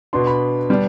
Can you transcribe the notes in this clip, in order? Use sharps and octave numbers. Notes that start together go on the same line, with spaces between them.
B2 B3 D4 C6
B5
D3 G3 B3 D4